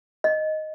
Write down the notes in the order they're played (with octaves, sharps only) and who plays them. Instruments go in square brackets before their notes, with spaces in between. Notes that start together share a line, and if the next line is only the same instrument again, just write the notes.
[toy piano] D#5